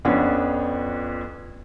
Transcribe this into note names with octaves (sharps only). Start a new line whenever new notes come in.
F2 B3 C#4 D4 F4